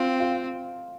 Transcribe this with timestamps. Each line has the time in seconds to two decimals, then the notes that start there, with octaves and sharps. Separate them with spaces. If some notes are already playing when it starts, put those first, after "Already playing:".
Already playing: C4 F4 F5
0.20 F4 F5